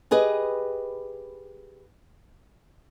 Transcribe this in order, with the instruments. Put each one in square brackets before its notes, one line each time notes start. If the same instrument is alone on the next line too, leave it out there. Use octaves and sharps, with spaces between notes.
[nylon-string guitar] G4 G#4 B4 D#5